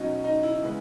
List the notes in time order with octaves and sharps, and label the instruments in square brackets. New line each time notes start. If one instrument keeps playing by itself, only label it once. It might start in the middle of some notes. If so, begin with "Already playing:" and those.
Already playing: [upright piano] B2 F#3 C#4 D#4
D#4
E4
C#3 E3 G#3 B3